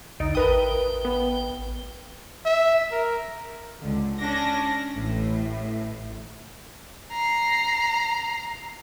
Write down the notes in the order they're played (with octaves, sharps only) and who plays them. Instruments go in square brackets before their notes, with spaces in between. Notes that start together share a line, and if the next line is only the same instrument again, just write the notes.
[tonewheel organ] B1 E2 D3 [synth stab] D#4
[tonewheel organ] A1 G5 [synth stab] A#4 B4 D#6
[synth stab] B3
[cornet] E5
A#4
[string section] C#2 D3
C#4 D4 A#6
A1 A2
[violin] A#5 C7